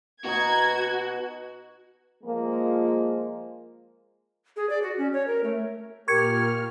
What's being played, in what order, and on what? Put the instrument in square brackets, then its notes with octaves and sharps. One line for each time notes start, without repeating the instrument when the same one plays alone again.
[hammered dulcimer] B2 D#4 [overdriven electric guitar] F#4 [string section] G#6
[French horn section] F3 G#3 A#3
[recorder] G#4
D5
F#4
C#4
C#5
A#4
A3
[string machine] A#2 F6 [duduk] G4 [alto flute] A#4 [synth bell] C#6 G#6 C#7